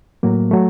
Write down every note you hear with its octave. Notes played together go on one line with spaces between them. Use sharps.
A2 F#3 A#3
F#3 A3